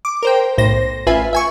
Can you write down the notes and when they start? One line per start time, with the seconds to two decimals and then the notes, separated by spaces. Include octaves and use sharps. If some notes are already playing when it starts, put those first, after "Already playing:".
0.05 D6
0.23 A#4 C5 G5
0.58 B1 A2 C5 A#6
1.07 A1 F4 B4 E5 G#5
1.33 E5 G#5 C#6